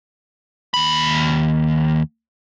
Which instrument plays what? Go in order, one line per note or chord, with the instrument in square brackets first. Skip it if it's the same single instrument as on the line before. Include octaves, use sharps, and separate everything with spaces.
[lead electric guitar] D#2 B5